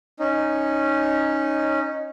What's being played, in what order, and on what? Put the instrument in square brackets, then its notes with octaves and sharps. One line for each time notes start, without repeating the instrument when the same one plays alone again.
[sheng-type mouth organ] C#4 D#4